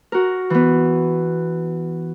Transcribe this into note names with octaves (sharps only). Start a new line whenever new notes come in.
F#4 A#4
E3 B3